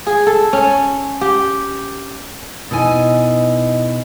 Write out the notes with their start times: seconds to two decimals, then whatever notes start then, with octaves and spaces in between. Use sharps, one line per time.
0.06 G#4
0.27 A4
0.53 C#4
1.21 G4
2.71 B2 D#4 E4 D#5 G#5